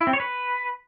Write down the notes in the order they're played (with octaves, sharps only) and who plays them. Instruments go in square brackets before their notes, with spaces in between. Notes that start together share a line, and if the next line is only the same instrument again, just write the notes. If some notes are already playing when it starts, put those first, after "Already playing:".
[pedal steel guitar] E4
C4
C#5
B4